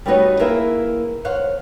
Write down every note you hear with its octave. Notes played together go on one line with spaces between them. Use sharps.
G3 A3 B3 D#4 F#4 C#5
A#3 E4 G#4 A#4 B4 E5
C5 C#5 F5 F#5